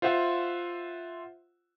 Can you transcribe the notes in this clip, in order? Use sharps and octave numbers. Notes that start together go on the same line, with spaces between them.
F4 C5 E5 F#5